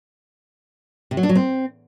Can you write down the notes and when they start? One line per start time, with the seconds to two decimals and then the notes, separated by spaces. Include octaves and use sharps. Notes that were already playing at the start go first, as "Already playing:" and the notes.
1.11 C3
1.17 F#3
1.23 D4
1.29 F#3
1.35 C4